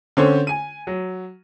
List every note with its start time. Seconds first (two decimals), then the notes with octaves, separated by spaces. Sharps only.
0.17 D3 C4 C#4 C5 C#5
0.47 G#5 D#7
0.87 F#3